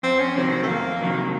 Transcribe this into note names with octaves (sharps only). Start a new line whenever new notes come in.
F2 C4
C#4
C3 D#3 F#3 C4
C4
A3
F2 A#3
C3 D#3 F#3